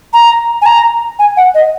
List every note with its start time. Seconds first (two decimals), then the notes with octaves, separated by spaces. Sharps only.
0.13 A#5
0.61 G#5
0.65 A#5
1.19 G#5
1.36 F#5
1.54 D#5